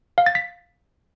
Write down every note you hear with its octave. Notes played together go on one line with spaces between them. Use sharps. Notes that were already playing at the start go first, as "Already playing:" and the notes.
F5
A6
B6